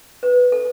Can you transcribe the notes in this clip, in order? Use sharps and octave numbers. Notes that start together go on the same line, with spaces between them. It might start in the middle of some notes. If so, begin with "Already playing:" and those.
B4
A4